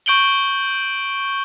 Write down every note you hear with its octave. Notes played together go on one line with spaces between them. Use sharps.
C#6 G6 D7 F#7 G7